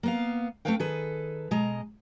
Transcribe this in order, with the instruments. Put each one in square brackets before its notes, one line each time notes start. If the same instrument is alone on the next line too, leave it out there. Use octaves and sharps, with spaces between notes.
[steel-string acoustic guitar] A#3 B3 F5
A3 C4 C#4 B4 F5 G5
D#3 G#4 A4 B4
B2 G#3 D#5 A#5